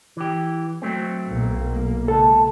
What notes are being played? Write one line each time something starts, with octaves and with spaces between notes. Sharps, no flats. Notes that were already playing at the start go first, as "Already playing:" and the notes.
E3 G4
F#3 A3 C4
B1 A#3
C#2 A4 A5